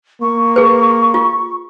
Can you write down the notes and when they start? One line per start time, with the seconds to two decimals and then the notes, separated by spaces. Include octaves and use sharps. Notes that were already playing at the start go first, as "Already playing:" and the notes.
0.21 A#3 C#6
0.56 G#4 B4
1.14 F4